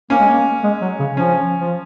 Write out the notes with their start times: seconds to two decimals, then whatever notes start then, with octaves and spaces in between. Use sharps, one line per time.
0.10 A#3 C#4
0.19 G#3
0.28 A#3
0.64 G#3
0.82 F#3
0.99 C#3
1.17 F3 C#4
1.60 F3